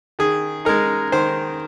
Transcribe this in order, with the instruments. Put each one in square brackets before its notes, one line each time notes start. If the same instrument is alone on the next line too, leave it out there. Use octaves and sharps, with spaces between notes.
[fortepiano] D#3 G#4
G#3 D#4 A#4
D#3 C5